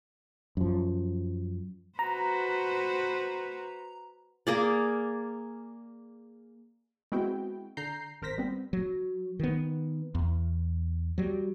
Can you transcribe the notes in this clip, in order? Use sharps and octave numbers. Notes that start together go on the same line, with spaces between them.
F#2 F3
F#4 B4 C5 A#5
A#3 G#4 D5
G#3 B3 C4 E4 F#4 G5
D3 A#5 G6 C7
G#1 A#4 C5 A#6 B6
G3 B3 C4
F#3
D#3 B3
E2
F#3 G3